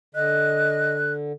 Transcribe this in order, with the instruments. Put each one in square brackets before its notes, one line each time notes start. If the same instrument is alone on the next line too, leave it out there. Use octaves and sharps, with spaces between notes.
[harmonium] D3 [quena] D#5 [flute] F#6